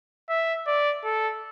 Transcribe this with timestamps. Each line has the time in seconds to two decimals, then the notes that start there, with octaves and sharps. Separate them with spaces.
0.29 E5
0.67 D5
1.04 A4